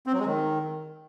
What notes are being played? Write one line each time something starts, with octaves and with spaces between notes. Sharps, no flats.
C4
F#3
G#3
D#3